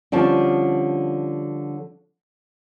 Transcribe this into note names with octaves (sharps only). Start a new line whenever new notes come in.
D3 F3 G3 C#4 A5